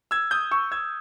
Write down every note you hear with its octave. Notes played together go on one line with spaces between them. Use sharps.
E6 G#6
D#6 G6
C#6 E6
E6 G#6